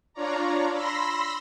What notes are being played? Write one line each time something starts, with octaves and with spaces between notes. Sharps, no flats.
D4 F4 C#5 D5 A#5
B5 C6 E6 A#6